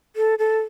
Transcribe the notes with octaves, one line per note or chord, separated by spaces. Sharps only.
A4
A4